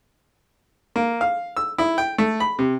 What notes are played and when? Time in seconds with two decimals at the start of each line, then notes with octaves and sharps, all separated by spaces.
0.96 A#3
1.21 F5
1.57 E6
1.78 E4
1.98 G5
2.18 A3
2.40 B5
2.59 C3